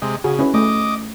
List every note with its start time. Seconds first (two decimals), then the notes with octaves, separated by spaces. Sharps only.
0.02 C3 G#3
0.24 C#3 F#4 G#4
0.39 C#4 E4 B4
0.54 A3 D#5 D6